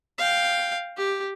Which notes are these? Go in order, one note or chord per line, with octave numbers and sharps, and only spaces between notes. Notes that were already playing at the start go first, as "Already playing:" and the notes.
F5 G5
G4